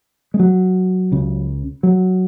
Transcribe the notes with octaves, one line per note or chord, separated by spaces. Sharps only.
G#3
F#3
C#2 C#3
F#3